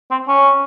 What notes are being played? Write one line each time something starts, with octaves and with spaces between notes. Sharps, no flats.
C4
C#4